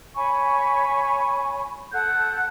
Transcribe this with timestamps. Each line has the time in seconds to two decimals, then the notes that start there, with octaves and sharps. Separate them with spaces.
0.15 C#5 G#5 B5 C#6
1.92 A4 F#5 F#6 G6